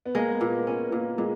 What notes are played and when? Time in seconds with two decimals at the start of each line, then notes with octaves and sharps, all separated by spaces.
0.06 B3
0.15 G#3 A#3
0.29 B3
0.40 A#2 A#3
0.67 B3 C#4
0.92 A#2 A#3
1.18 A#2 G#3